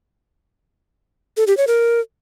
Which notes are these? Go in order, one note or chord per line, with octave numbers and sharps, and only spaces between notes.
A4
G4
C#5
A#4